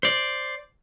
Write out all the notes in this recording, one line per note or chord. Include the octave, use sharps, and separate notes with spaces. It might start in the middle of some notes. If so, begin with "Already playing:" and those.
C5 D5